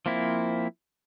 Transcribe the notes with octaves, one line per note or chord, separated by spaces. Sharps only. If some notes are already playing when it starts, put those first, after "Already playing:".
F3 A#3 C4 E4